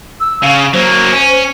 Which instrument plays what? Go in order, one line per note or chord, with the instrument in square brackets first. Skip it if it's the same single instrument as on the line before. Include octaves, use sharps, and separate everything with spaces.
[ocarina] E6
[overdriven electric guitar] C#3 [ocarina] F5
[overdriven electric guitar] F#3 A#3 [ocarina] C5
[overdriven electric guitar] C#4